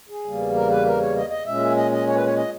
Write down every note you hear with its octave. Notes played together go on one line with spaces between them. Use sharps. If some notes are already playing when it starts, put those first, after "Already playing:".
G#4
E2 C#3 G3 A#3
A#4
B4
A#4
C#5
D#5
D#5
A#2 G#3 C#4 E5
D#5
D#5
C#5
B4
C#5
D#5